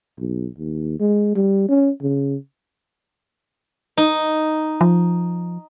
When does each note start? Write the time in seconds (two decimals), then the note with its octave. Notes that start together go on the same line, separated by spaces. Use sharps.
0.18 B1
0.58 D#2
1.00 G#3
1.35 G3
1.69 C#4
2.02 C#3
3.97 D#4
4.81 F3